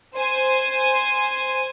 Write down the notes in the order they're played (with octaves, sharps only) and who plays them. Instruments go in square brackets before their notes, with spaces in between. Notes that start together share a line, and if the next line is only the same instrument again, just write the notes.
[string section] C5 G#5